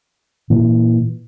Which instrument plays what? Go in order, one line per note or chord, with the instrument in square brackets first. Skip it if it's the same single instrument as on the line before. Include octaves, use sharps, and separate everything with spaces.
[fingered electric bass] A#2 E3